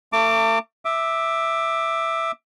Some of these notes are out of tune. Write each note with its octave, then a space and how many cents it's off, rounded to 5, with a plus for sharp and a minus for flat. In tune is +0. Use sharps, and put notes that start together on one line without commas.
A3 +35 A5 +40 D6 +0
E5 +0 D6 +15